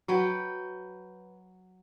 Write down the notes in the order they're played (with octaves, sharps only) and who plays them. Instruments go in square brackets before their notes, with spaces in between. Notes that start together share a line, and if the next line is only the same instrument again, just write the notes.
[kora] F#3 B4 G5